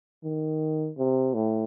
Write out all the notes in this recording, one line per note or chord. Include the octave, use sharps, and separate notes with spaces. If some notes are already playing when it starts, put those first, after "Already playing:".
D#3
C3
A2